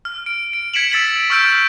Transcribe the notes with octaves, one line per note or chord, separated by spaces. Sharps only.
F6
D7
D7
G#6 B6 C#7 D7 E7 F#7
E6 A6 B6 D7 F#7
C#6 E6 F6 G6 B6 D7